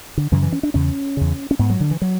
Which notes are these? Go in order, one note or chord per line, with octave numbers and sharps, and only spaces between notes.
D3
F#2 C#3 E3
E3
C#4
D4
E2 C#3 C#4
E2 C#3
C#4
G#2 B3
F#3
D3
E3
F#3